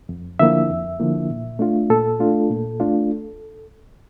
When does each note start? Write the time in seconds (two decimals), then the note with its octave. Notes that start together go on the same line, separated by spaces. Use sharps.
0.09 F2
0.39 D3 F3 A#3 E4 E5
0.69 F2
1.00 D3 F3 A#3 E4
1.30 A#2
1.59 A3 D4 F4
1.90 A#2 A4
2.20 A3 D4 F4
2.50 A#2
2.80 A3 D4 F4